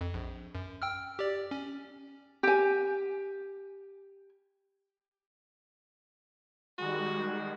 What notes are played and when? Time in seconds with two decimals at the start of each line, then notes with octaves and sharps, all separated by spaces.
0.01 F2
0.14 A#1
0.55 F#2
0.82 G5 E6 F6
1.19 G4 D5
1.51 C#4
2.43 G4 G#5
6.78 D#3 G3 G#3 F#4